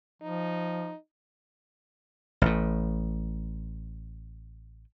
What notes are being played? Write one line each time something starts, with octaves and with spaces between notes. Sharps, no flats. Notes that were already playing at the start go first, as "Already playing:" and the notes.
F3 D#4
A1 A2